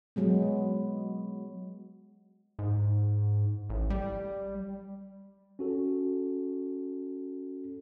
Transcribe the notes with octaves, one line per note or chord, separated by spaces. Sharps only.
F#3 G#3 B3
G#2
A1
G3
C#4 F#4 A4